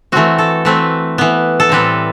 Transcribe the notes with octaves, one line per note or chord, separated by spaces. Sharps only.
E3 A3 C4 F#4
A4
E3 A3 C4 B4
E3 B3
A4
A2 E3 G3 C4 B4